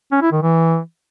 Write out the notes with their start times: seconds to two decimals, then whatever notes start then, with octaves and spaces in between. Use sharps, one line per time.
0.12 C#4
0.22 E4
0.32 D#3
0.42 E3